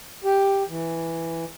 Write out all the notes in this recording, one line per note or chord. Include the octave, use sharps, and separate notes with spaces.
G4
E3